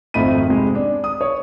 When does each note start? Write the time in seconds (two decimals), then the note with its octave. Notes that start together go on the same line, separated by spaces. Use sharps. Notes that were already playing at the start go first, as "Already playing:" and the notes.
0.14 G#1 F2 A3 D#4 B5 D#7
0.49 C3 G#3
0.75 D4
1.04 D#6
1.21 C#5